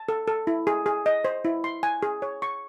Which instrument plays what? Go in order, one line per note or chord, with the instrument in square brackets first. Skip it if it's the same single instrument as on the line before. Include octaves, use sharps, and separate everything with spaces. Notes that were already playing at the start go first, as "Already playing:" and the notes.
Already playing: [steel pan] A5
A4
A4
E4
G#4
G#4
D#5
C5
E4
C6
G#5
G#4
C#5
C#6